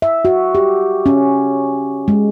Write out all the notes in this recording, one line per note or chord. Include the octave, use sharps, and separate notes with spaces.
E5
F#4
G4
C#4
G#3